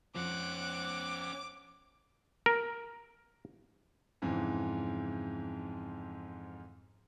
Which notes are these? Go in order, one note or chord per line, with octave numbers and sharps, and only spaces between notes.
F2 F3 C#4 C5 F#5 D6
A#4
F2 G#2 C#3 E3